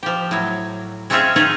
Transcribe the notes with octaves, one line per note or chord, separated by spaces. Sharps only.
F3 G4
A2 F#3
G#3 A3 C4 C#4 F4 G#4
D#3 C#4 D#4 F4 G#4 C#5